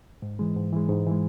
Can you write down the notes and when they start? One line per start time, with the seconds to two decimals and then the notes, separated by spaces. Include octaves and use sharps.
0.22 G#2
0.39 E3 G#3
0.56 G#2
0.73 E3 G#3
0.90 G#2
1.06 E3 G#3